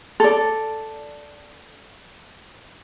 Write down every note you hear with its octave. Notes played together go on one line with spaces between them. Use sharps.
A4 D5